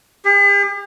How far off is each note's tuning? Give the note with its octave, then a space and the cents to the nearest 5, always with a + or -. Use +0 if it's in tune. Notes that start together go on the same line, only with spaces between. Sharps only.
G4 +45